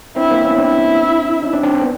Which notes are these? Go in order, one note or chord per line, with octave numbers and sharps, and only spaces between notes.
C4 D4 E4
A#3 C4
B3 C#4
C4 D4 E4
C#4 D#4
C4 D4
C4 D4
C4
B3